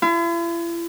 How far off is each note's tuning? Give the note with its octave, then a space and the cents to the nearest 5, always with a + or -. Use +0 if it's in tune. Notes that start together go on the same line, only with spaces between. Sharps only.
E4 +45